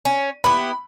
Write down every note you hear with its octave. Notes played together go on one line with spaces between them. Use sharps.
C#4
B3 E4 G4 B5